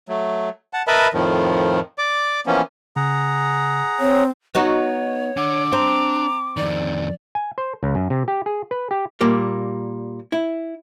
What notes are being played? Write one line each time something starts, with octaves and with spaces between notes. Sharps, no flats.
F#3 A3
F#5 A5
A#4 B4 D#5 E5 A5 B5
F2 A2 D#3 F3
D5 D6
E3 F3 A#3 B3 C#4
C#3 G#4 F#5 A#5
C4 C#5
B3 D#4 F#4 C#5
D4 F#5 D6
C4 D4 A#5
F2 D#3 D5
G#5
C5
C#2
F#2
C3
G4
G#4
B4
G4
A#2 G3 A#3
E4